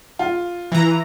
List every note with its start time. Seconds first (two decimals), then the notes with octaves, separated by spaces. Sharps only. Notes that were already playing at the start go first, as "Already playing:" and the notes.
0.19 F4
0.72 E3 A#5